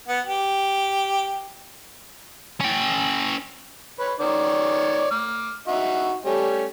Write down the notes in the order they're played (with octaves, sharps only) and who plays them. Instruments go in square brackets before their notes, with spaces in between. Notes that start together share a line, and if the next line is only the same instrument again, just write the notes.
[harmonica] B3
G4
[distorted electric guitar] C#4 G5
[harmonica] B4 C#5
D#3 C#5 D5
D6 F6
D#4 F#4 E5
G3 A3 C#4